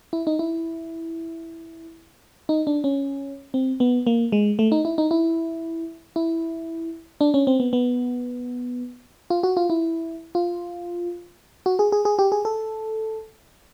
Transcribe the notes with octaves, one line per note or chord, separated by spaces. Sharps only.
E4
D#4
E4
D#4
D4
C#4
C4
B3
A#3
G#3
A3
D#4
E4
D#4
E4
E4
D4
C#4
C4
B3
B3
F4
F#4
F4
E4
F4
F#4
G#4
G#4
G#4
G4
G#4
A4